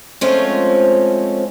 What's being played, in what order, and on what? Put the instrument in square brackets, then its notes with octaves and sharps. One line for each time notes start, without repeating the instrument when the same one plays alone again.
[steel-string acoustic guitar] F3 G#3 A3 C4 C#4 F4